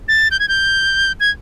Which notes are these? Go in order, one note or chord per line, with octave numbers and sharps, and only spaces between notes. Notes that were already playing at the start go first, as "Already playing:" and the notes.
A6
G6
G#6
G6
G#6